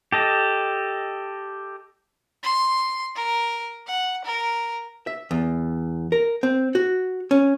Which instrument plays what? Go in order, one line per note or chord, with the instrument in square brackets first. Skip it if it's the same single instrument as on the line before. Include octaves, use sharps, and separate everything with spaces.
[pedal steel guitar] G4 A4 D#5
[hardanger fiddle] C6
A#4
F#5
A#4
[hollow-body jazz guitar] E5
E2
A#4
C4
F#4
C#4